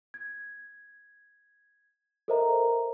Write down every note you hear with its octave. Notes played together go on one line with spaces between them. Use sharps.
G#6
A4 A#4 C5 D#5 E5 A#5